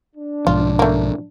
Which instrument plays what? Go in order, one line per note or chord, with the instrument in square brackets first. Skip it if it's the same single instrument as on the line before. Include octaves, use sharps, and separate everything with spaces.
[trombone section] D4
[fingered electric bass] B1 G#2 F3 [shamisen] F4
[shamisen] A3 A#3